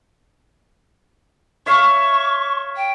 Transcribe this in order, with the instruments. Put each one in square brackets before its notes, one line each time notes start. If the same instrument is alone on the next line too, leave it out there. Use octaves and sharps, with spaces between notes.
[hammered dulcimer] C#5 E5 F5 [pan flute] C#6
[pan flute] G5